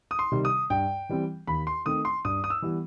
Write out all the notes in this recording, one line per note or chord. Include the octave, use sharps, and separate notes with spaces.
D#6
C6
C3 D#3 G3
D#6
G2 G5
E3 G3 C4
D#2 B5
C6
D#3 A3 C4 D#6
C6
G2 D#6
D#6
E6
E3 G3 B3